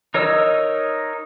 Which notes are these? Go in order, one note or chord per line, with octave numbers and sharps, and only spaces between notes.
D#4 A#4 C#5 D#5 E6